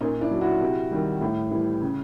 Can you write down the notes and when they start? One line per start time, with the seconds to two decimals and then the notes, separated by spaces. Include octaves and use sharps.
0.01 A#2 C#4 D#4
0.21 D4 E4
0.31 F#3
0.41 E4 F#4
0.61 C3
0.91 D#3 G3
1.21 A2
1.51 E3 G3
1.81 C#3